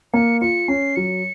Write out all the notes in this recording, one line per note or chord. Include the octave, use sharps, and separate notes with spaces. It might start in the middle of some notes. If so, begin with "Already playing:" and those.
A#3 C#7
F4 C#7
C#4 C7
F#3 C#7